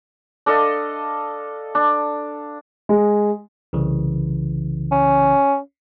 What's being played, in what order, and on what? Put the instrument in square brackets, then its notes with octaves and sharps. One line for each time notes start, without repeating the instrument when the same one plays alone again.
[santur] D4 A4 D#5 F5
D4
[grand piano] G#3
[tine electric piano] C2 C#3 E3
[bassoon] C#4